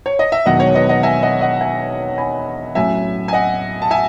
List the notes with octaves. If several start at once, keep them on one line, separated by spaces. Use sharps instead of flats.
C#5
D#5
E5
E1 E2 D#3 F#3 B3 D#5 F#5
C#5
B4 D#5
D#5 F#5
E5 G#5
D#5 F#5
D#5 F#5
E5 G#5
G#5 B5
A1 A2 F#3 E5 G#5
G#5
D#5 F#5
A5
E5 G#5